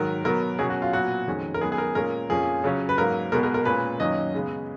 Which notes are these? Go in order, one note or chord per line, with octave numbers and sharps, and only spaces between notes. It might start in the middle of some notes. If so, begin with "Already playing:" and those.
Already playing: G#2 D#3 F#3 A#4
B2 F#3 B3 A#4
B2 F#3 C#4 G#4
F#4
F4
A#2 F#3 B3 F#4
F2 D#3 G#3 C#4
A#4
F#2 D#3 G#3 B3 G#4
G#4
A#4
A#2 G#3 C#4 A#4
F2 F3 A#3 C#4 G#4
C#3 F#3 C#4
B4
G#2 F#3 A#3 A#4
B2 G#3 B3 A#4
A#4
A#4
A#2 G#3 C#4 B4
F#2 D#3 F#3 A#3 C#4 D#5
C#3 G#3 B3